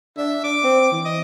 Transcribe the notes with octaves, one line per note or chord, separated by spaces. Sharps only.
D4 E5
D4 D6
C4
E3
D#5